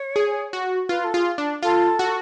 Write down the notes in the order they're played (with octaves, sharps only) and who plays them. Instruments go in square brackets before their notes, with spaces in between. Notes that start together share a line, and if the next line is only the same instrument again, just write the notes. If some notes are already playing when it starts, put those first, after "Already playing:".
Already playing: [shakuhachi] C#5
[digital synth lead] G#4
F#4
[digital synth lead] F4 [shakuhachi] B4
[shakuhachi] A4
[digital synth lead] F4 [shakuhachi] G#4
[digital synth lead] D4
[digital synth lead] F4 [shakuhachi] A4
[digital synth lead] F#4